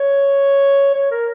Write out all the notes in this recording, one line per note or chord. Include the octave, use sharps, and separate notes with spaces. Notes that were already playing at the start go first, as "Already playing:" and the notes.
Already playing: C#5
C#5
A#4